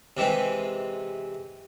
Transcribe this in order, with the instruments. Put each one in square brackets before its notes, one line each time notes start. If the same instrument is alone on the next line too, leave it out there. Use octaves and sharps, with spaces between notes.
[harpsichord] C3 E3 G#3 C4